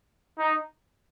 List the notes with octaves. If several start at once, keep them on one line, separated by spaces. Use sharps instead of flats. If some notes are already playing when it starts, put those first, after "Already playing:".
D#4